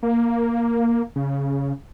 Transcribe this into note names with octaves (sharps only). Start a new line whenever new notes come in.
A#3
C#3